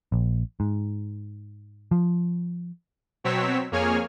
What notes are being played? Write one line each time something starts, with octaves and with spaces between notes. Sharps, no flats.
A#1
G#2
F3
B2 F#3 C4 C#5 E6 B6
F2 A#3 G#4 C#5 G#5 F6